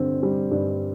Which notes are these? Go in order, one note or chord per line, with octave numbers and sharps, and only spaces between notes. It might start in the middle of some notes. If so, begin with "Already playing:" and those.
Already playing: G2 D3 G3 C4
G3
G2